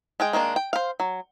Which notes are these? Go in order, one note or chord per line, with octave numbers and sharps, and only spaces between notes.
G#3 G#4 G5
D#3 G#3 A#3 D4
G5
C5 F5
F#3